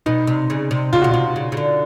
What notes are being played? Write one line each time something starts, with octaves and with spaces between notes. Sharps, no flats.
B2 D#4
C3
C#3
C3
C#3 F4
B2 F#4
C3 F4
C#3
C#3
D3